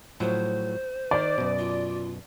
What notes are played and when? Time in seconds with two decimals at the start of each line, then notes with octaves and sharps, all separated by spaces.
0.20 A2 F3 F#3 C5
1.11 D#3 D5
1.38 F#2 B2
1.58 F4